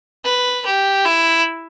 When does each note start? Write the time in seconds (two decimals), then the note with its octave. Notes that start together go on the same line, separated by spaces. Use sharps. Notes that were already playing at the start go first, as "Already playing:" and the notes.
0.25 B4
0.66 G4
1.05 E4